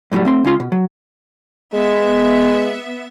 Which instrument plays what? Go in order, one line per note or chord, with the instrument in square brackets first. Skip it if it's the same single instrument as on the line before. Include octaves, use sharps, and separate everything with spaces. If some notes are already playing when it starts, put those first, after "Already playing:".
[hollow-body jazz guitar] F#2 A2 D3 F#3 G3
A3 C4 C6
C#2 C#4 F4 C6
B2
F#3
[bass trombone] G#3 [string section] B3 E5